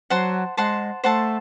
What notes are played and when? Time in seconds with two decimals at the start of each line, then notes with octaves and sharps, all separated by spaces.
0.10 F#3 C5 F#5 A5 C6
0.57 G#3 C5 F#5 A5 C6
1.04 A3 C5 F#5 A5 C6